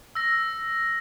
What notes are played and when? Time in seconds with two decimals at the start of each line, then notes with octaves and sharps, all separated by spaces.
0.15 E6 A#6